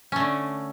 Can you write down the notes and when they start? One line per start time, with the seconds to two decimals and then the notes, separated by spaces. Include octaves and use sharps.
0.12 C#4
0.16 A3
0.20 D3